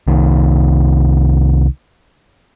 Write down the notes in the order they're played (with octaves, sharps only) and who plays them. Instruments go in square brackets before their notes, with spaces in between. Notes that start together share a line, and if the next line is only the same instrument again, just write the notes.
[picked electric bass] C2 D#3